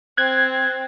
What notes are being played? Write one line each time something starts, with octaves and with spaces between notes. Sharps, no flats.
C4 F#6 G#6